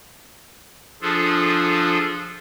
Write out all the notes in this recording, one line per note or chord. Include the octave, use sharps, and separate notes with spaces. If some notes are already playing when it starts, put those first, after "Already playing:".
F3 D4 F4 G#4 A4